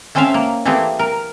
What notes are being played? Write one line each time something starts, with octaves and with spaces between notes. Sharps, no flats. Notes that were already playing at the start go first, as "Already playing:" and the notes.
A3 C4 C#4 C5 E5 F5
A#3
E3 A3 A#3 C4 G4 G#4
A#4